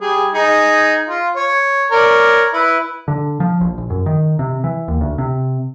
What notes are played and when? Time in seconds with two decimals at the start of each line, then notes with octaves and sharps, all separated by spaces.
0.01 G3 G#4
0.34 D#4 G#4
1.09 F4
1.36 C#5
1.92 A#4 C#5 D5
2.53 E4 B4
3.08 D3
3.40 F3
3.61 A#1
3.78 A#1
3.90 F#2
4.06 D#3
4.39 C3
4.64 E3
4.88 D#2
5.01 D2
5.18 C3